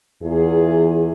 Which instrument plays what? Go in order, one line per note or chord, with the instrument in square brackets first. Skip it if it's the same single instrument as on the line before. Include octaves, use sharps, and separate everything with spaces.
[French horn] E2 [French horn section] B3 F4 G#4